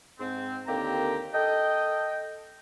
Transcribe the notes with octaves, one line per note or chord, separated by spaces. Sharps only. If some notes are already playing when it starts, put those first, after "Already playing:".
G#2 C4
D#2 D3 A#3 C4 G4 A#5
A4 D#5 G5